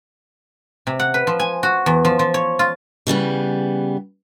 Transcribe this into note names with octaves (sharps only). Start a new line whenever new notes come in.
C3
F#5
B4
F3
G#5
F#4
E2
F3
F3
C#5
F4
C#3 E3 G3 B3